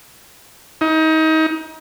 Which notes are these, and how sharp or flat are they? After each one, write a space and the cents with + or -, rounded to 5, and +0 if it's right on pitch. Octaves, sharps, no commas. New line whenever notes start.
D#4 +30